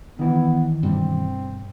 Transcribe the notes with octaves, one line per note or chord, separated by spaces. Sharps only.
D#3 E3 B3
G2 B2 G3 C4